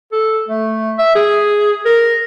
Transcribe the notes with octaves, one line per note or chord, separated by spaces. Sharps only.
A4
A3
E5
G#4
A#4